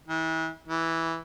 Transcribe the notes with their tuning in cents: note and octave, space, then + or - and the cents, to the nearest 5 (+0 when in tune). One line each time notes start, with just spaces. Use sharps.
E3 -35
E3 -5